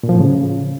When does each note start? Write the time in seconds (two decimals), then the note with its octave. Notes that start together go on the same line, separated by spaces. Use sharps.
0.03 A#2
0.09 F3
0.15 A2
0.20 C#3